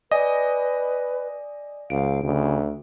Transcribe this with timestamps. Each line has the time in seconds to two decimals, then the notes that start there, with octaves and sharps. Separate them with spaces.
0.11 B4 D5 D#5 G#5
1.90 C#2 F5 D7
2.23 D2 C#3